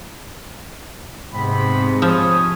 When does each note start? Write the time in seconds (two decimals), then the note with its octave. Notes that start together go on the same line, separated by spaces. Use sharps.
1.33 G#2 C3 G#3 B3 C4 B5
2.02 F3 G#4 C#5 D#6